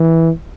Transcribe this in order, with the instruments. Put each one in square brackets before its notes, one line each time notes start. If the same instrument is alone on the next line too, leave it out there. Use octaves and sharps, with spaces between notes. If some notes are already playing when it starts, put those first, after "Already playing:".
Already playing: [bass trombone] E3